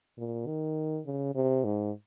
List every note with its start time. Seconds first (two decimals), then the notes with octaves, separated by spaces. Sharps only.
0.18 A#2
0.47 D#3
1.06 C#3
1.35 C3
1.64 G#2